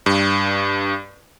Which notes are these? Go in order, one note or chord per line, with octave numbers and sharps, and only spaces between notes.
G2